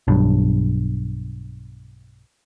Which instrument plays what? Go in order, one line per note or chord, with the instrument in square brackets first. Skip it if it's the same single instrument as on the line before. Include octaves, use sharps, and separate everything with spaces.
[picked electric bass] B1 G2